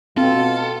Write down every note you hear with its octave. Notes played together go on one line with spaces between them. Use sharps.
B2 C4 F4 A4